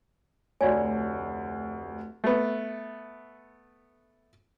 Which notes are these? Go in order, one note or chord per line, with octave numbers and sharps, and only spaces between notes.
F1 D2 F#4 C#5 D5 G#5
A3 B3